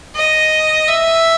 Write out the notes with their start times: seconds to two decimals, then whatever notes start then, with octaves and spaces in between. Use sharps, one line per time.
0.16 D#5
0.89 E5